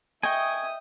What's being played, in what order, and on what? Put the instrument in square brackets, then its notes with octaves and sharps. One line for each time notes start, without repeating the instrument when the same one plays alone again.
[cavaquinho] D#5 G5 [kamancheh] E5 D#6 [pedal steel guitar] G#5 C#6